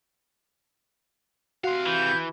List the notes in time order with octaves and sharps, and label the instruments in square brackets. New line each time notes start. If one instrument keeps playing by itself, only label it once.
[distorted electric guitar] C3 F5 [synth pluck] F#4 C6 [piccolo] F#6
[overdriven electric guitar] E3 [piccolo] G6